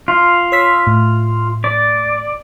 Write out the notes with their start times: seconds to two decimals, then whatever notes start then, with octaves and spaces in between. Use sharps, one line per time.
0.08 F4
0.52 C#5 E6 B6
0.87 A2
1.64 D5